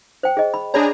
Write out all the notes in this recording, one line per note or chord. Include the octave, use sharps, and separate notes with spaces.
C5 G5
G#4 D#5
B5
D4 G#4 C#5 D5 A#5 B5